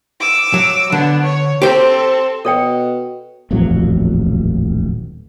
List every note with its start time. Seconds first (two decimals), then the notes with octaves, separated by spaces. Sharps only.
0.20 D6 E6
0.54 F#3
0.92 D3 B3 D4
1.24 C#5
1.62 C4 G4 A4 C5
2.45 B2 A4 C#5 G5
3.51 D#1 A1 F2 F#3